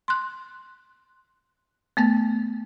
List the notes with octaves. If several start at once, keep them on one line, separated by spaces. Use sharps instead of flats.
C6 F#6
A3 B3 A6